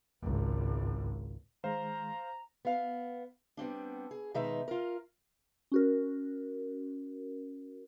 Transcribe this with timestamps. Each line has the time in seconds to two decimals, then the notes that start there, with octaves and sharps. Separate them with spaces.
0.22 G#1 C#2
1.64 D#3 G#3 C5 F5 A#5
2.65 B3 F5
3.57 G3 B3 C4 D4
4.11 G#4
4.34 B2 D#3 G#3 D#4 B4 E5
4.68 F4 A#4
5.72 C#4 F#4 A#4